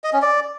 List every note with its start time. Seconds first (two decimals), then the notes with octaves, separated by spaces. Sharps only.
0.04 D#5
0.13 C#4
0.22 D5